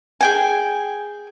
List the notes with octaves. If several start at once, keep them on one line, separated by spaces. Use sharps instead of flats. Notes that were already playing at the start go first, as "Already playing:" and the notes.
G#4 G5 G#5